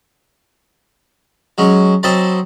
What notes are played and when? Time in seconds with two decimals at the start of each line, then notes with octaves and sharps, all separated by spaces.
1.58 F#3 G#3 C#4
2.03 F#3 C4 A4 D#5 A5 B5